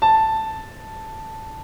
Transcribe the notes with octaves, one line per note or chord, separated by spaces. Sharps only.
A5